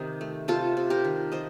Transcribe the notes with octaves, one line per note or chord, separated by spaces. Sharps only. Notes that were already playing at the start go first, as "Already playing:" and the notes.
Already playing: C3 D#3 D#4 G4
A3
C3 F4 A4
C3
G4 A#4
D#3
F3 C5 D#5